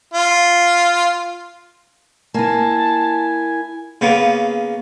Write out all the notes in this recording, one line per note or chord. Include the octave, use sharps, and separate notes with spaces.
F4
A#3 E4 G#5 A5
C#3 A#3 B3